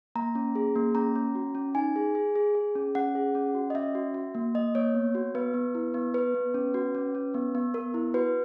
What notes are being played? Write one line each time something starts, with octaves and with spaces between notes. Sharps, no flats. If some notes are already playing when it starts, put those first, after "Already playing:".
A#3 A#5
C#4
G#4
A#3
C#4 A#5
C#4
F#4
C#4
D#4 G#5
G#4
G#4
G#4
G#4
C#4
C#4 F#5
G#4
C#4
F#4
D#5
C#4 E5
F#4
F#4
A#3
A#3 D#5
A#3 C#5
B3
F#4
B3 B4
B3
E4
B3
B3 B4
B3
C#4
F#4
C#4
C#4
B3
B3
B3 A#4
E4
F#4 B4